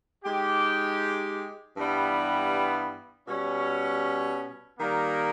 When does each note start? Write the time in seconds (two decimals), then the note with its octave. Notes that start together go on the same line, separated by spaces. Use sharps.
0.24 G#3 D#4 G4
1.76 G2 E3 G3 B3
3.26 B2 G3 C#4
4.79 D#3 G3 A#3